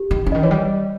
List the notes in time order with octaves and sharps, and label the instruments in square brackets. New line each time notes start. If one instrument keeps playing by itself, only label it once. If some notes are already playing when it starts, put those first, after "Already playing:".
Already playing: [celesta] G4
[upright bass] D#3
C#3
[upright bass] D#3 [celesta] D#5
[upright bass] E3 [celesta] C#5
[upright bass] G3